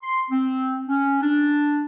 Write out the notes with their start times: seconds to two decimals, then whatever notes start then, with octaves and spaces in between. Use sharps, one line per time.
0.03 C6
0.30 C4
0.88 C#4
1.22 D4